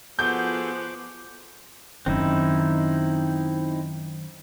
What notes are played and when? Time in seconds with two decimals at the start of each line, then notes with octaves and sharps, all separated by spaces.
0.19 F3 B3 F#4 G#4 A4 C5 D6 G6
2.06 F#2 D#3 C4 D#4 E4